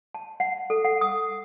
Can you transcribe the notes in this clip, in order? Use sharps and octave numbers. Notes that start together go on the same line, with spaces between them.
A5
F#5
A4
F#5
D#6